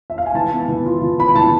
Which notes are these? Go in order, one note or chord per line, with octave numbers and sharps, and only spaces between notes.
E5
F5
G#5
E3 A5
B3
E3
F4
E3
B3 B5
E3 A5